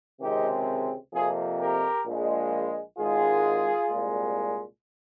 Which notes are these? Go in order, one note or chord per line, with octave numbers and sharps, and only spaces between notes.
C#2 C3 D#3 G#3 C4 D#4 G4
F2 C3 F3 A#3 F4 G#4
G4 A#4
A#1 A#2 G#3
G#1 G#2 D#3 G#3 F4 G#4
C2 A#2 G#3